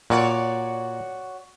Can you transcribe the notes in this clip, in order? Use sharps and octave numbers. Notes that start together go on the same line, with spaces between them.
A#2 F#4 C#5 D5